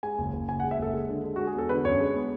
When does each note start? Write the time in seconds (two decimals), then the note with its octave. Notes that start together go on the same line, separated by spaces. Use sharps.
0.03 G#3 G#5
0.18 F#1
0.33 F#1
0.48 F#1 G#5
0.60 F#5
0.63 G#3
0.71 E5
0.79 F#1 A4
0.94 G#3
1.09 D3
1.24 G#3
1.36 G#3 F#4
1.47 G#4
1.54 E2 A4
1.69 D3 B4
1.85 F#2 C#5
2.00 G#3
2.15 B3